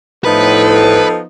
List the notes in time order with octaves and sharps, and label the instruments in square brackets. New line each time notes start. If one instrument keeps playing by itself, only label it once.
[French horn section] A2 [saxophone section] F3 B3 D#4 [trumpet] A4 [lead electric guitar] B4